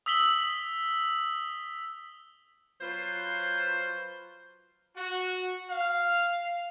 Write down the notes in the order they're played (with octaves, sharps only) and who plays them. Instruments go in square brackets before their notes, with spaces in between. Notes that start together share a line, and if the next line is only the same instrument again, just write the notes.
[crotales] D#6 E6 B6 F#7 G7
[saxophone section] F#3 F4 B4 C5
[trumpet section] F#4
F5